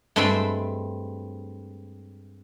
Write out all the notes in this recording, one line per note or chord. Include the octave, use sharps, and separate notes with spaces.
G2 G#3 A3 C4 E5 B5